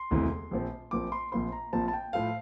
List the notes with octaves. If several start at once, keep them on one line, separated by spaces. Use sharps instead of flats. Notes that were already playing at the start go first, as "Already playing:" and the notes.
Already playing: C6
E1 D2 C3 E3
A#1 A#2 F3 C4
A#1 A#2 F3 C4 D6
C6
A#1 A#2 F3 C4 C6
A#5
A#1 A#2 F3 C4 A5
A5
G5
A2 F3 A3 F5